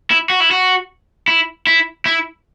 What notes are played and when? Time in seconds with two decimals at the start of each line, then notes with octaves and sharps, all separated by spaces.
0.11 E4
0.30 F#4
0.40 E4
0.51 F#4
1.28 E4
1.67 E4
2.06 E4